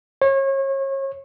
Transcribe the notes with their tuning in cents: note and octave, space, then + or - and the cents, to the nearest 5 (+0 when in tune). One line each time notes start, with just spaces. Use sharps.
C#5 -35